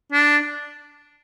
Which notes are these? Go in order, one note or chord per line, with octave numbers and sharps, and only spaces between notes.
D4